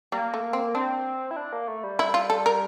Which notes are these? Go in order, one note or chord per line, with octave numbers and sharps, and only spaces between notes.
G3 A#3
A3
C4
C4 D4
E4
D4
A#3
A3
G3
E4
F4
A4
A#4